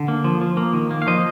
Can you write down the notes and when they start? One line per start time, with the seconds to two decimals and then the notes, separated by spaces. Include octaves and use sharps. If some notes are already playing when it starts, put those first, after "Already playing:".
Already playing: D3
0.08 A#3
0.24 F3
0.41 F3
0.57 A#3
0.73 D#3
0.91 A#3
1.02 F5
1.07 F3 C5 D#5